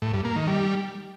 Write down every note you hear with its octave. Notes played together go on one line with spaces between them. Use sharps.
A2
G2
A#3
D#3
G3